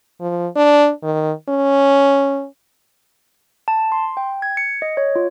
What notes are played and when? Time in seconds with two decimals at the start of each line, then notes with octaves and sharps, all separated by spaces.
0.20 F3
0.56 D4
1.03 D#3
1.49 C#4
3.68 A5
3.92 C6
4.17 G5
4.42 G#6
4.57 C#7
4.82 D#5
4.97 C#5
5.16 F4